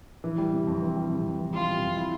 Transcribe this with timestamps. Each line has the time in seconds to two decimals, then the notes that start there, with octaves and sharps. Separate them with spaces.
0.24 E3
0.38 G3
0.52 C3
0.67 F2
0.82 E3
0.96 G3
1.11 C3
1.25 F2
1.39 E3
1.53 G3 F4
1.68 C3
1.83 F2
1.97 E4